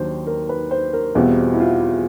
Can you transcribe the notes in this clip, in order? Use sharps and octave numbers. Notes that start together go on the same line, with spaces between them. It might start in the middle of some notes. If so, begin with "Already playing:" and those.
Already playing: D#2 D#3 F#3 D4 C5
A#4
B4
C5
A#4
E2 B2 G3 C4 F4
E4
F4